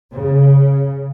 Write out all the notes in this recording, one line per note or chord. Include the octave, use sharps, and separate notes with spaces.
C#3